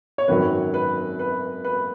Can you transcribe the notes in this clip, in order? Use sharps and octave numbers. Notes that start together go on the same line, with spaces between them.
C#5
G#1 F#2 D#3 F#3 B4
B4
B4
B4